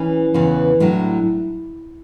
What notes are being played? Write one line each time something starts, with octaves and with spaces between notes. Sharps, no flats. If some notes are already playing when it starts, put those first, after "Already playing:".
Already playing: E3 C#4
E2 C#3 E3
A2 F#3 D4